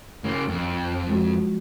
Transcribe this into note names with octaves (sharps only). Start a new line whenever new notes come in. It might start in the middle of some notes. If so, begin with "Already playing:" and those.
C#3 A#3
F2
F3 G#3 F#4